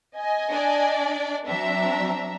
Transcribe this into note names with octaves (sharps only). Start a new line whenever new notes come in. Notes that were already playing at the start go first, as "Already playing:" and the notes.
D#5 G#5
D4 D5
F#3 C4 D4 E5 A#5